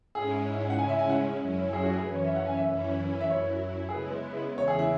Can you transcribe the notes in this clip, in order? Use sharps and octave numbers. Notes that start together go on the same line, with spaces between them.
G#2 G#3 C#4 E4 G#4
F#5
C#3 G#3 C#4 E4 G#5
E5
G#5
F#5
F#2 F#3 C#4 E4
G#4
F#4
G#4
F#2 E3 C#4 B4
C#5
E5
F#5
G#5
E5
F#2 E3 C#4 E4
E5
F#2 F#3 E4 C#5
G#4
C#3 G#3 B3 E4 B4
E2 C#3 E3 C#5
G#4
E4